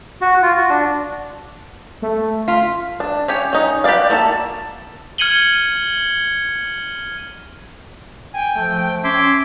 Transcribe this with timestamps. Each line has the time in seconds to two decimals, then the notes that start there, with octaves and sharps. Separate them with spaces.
0.21 F#4
0.43 F4
0.57 F#4
0.70 D4
2.02 A3
2.48 F4 B6
3.00 D4
3.28 C#4 G4 C#5
3.53 C#4 D#4
3.84 G4 B4 C#5 D5 F5
4.10 A#3 F#4 A4 A5
5.18 F6 G#6 C#7 D#7 F#7 G7
8.34 G5 G#5
8.55 F3 A3
9.04 C#4 E5 C6 D6 G#6